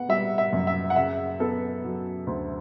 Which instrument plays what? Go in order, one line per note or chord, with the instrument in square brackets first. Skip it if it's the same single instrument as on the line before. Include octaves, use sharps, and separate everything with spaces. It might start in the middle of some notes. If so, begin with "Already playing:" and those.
Already playing: [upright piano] B3 F#5
G3 E5
E5
F#2
E5
F#5
C#3 E5
B3 A4
F#3
D2